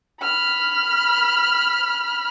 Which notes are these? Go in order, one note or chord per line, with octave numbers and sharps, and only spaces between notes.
B5 F6